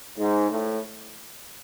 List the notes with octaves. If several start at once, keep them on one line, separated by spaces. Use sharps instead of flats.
G#2
A2